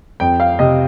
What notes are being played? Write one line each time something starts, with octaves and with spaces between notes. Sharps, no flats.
F2 G5
F5
C3 D#5